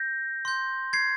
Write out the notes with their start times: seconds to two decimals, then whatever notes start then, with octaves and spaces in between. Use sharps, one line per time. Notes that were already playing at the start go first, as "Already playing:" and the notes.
Already playing: G6 A#6
0.45 C6 G6
0.93 G#6 C7